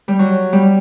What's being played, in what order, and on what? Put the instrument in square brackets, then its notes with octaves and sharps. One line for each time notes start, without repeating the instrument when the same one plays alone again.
[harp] G3
F#3
G3